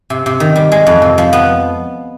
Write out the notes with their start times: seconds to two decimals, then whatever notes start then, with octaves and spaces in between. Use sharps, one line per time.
0.10 C3
0.26 C3
0.40 D#3
0.56 G3
0.72 G#3
0.87 F2
1.02 C3
1.18 F3
1.33 B3